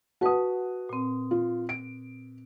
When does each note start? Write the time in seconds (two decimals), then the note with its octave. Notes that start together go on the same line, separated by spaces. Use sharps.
0.21 F#4 B4 F#5 A5 D#6
0.89 A#2 C4
1.31 F4
1.69 D7